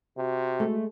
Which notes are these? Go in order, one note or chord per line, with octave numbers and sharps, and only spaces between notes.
C3 F#4
G#3 A3 A4